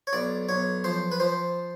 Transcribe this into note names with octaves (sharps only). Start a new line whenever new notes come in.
C#5
B1 D5
B1 C#5
F3 C5
B4
F3 C5